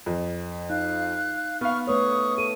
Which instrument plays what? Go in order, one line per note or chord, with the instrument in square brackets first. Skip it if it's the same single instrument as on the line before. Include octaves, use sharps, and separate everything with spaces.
[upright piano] F2
[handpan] D#4 [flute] F5 [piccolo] F#6
[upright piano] B3 F5 [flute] C#6 [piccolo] F6
[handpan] A3 B4 C#5 [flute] C#6 [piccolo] D#6
[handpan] A4 [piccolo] D#7